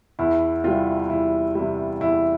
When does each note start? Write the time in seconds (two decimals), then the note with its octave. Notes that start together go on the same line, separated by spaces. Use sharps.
0.19 E2 E4
0.64 C3 E3 G3 F4
1.10 E2 E4
1.55 C3 E3 G3 E4
2.01 E2 E4